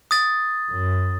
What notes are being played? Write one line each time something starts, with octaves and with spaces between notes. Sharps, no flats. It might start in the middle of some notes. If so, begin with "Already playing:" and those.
D#6 A6
F#2